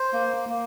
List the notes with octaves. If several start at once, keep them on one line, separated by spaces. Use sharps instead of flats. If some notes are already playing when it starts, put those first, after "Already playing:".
Already playing: C5
A#3
A#3